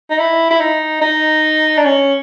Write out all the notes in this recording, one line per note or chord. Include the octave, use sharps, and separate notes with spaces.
D#4
E4
E4
D#4
D#4
D4
C#4